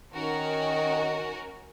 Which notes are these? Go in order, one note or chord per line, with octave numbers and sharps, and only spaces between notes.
D#3 C#4 F#4 A#4